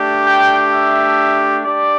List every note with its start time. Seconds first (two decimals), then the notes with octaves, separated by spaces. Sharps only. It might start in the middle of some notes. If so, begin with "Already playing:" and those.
Already playing: A3 D4 G4
0.25 G5
0.72 E5
1.66 D4 G4 D5